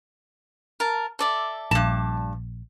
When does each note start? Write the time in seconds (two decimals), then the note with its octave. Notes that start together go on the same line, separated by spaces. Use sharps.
0.80 A#4 A5
1.19 A4 D5 E5
1.71 A#1 G2 A5